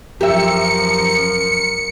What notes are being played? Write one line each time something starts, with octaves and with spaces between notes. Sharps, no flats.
F#2 F3 G4 A#4 E5 C#7